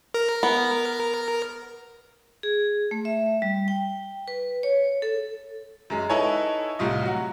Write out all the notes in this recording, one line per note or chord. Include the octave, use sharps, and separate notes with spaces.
A#4
B3
G#4
A3
E5
G3
G5
B4
C#5
A4
F#2 G#3
D#4 E4 A4 B4 C#5 G#5
C2 A2 G3 F4 D#5
F#3 F#4